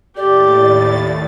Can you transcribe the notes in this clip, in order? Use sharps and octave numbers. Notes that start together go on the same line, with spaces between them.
D#2 A2 G4 D5 A6